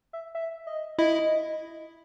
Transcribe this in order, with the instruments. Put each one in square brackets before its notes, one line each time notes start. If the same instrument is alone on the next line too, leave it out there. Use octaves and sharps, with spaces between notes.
[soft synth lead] E5
E5
D#5
[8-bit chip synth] E4 [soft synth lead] D#5